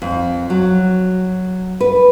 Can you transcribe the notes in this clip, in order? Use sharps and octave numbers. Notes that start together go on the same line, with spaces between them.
F2
F#3
B4